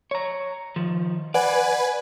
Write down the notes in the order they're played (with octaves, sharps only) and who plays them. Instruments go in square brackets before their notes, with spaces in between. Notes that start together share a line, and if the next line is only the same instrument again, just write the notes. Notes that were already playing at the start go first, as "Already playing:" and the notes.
[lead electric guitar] C#5 A#5
D#3 F3
[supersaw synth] B4 G#5 [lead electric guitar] D5 [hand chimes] F#5